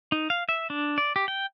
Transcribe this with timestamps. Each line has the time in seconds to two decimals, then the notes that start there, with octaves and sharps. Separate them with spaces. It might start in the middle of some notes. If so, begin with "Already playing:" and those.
0.12 D#4
0.30 F5
0.49 E5
0.70 D4
0.98 D5
1.16 G4
1.28 G5